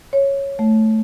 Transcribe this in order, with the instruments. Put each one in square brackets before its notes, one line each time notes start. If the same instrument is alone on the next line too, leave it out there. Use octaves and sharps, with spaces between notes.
[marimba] C#5
A3